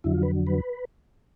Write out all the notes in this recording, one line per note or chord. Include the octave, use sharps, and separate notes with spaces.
F2 D3 F#3 E4
F4
B4
B4